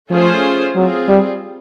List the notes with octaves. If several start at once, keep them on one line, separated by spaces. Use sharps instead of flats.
F3 A3 C#4 F4 G#4 C5
F#3 C4 F4 G#4
G3